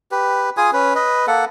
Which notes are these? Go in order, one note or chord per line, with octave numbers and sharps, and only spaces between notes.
G4 B4
F4 G#4 G#5 D#6
C#4 B4
B4 D#5
A#3 A4 F#5